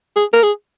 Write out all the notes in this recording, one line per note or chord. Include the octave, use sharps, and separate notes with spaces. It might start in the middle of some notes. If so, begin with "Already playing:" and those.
G#4
A#4
G#4